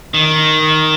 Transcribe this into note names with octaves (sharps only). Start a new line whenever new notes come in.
D#3